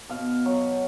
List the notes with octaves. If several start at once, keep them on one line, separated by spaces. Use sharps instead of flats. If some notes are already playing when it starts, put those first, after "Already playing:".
B2 F5
F#3 C#5